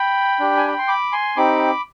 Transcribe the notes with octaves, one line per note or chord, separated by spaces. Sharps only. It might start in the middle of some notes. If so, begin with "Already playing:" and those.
Already playing: G5 B5
D4 G4
G#5
B5
C6
B5 D6
G#5 C6
C4 D#4 G4 B5 D6